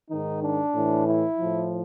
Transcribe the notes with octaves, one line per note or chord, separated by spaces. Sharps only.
G#2 D#3 D#4
D4
A2 E3
E4
A2 F3